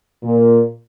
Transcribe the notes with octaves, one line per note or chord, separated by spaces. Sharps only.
A#2